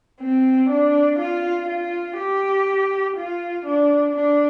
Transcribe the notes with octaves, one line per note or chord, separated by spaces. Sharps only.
C4
D4
F4
F4
G4
F4
D4
D4